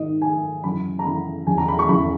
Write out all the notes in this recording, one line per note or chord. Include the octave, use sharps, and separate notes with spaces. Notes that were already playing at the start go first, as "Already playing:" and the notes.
Already playing: G#2 D#3 D#5
G#2 D#3 G#5
F#2 C#3 E3 B5
A#5
F#2 C#3 E3 B5
E2 C#3 E3 G#5
A#5
B5
C#6
E2 C#3 E3 B5